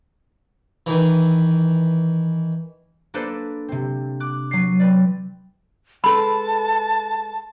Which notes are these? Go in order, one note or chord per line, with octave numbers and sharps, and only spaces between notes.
D#3 E3
A#3 D4 A4 B4 C5
C3 C4
D6 F#6
F#3 C7
C4 B4 D5
G#3 A4 B4 A5 B5